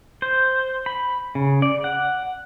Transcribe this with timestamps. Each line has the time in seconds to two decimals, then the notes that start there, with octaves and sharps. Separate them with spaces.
0.22 C5
0.86 B5
1.35 C#3
1.62 D5
1.84 F#5